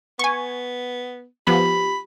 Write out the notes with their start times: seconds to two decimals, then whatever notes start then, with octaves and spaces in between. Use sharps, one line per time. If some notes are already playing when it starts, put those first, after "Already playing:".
0.19 B3 G#5 C#6
1.47 F3 B3 G4 B5